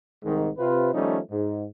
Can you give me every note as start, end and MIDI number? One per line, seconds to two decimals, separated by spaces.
0.23 0.49 36
0.23 0.49 44
0.23 0.49 51
0.58 0.89 48
0.58 0.89 65
0.58 0.89 71
0.94 1.19 51
0.94 1.19 53
0.94 1.19 55
0.94 1.19 57
0.94 1.19 61
0.94 1.19 63
1.31 1.65 44